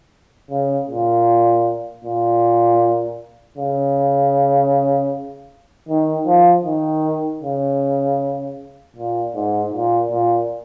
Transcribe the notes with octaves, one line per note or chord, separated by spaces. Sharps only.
C#3
A#2
A#2
C#3
D#3
F3
D#3
C#3
A#2
G#2
A#2
A#2